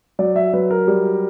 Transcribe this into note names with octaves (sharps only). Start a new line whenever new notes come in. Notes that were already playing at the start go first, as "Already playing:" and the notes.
F#3 D5
E5
F#3 B4
A#4
G3